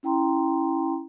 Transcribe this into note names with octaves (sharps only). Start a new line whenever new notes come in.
C#4 E4 G5 A#5 C6